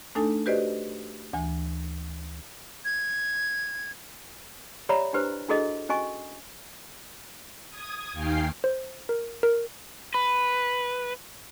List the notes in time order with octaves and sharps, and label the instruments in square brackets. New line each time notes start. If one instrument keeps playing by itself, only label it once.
[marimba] A3 D4 D#4 A4 G#5
F#4 G4 B4 C5 D5 D#5
D2 E3 G#5
[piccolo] G#6
[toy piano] G4 C#5 D5 E5 A#5 B5
D4 E4 G4 B4 C5
D4 E4 F#4 G#4 A4 D#5
C#4 F#4 D#5 G#5 C#6
[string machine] D#6 G#6
D#2 D#3 F5 G5 G#5 C7
[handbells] C5
A#4
A#4
[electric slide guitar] B4